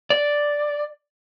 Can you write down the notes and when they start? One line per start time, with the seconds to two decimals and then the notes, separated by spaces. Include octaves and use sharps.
0.10 D5